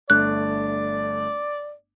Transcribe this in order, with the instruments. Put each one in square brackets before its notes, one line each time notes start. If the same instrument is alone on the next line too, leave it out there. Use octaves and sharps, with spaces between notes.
[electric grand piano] G1 A3 D4 [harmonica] D5 [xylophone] F#6